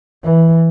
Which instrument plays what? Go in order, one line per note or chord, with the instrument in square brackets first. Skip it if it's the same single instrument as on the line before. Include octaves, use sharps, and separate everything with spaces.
[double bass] E3